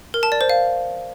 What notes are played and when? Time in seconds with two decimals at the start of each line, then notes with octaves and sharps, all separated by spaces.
0.14 A#4
0.23 A5
0.32 D5
0.41 C5
0.50 F5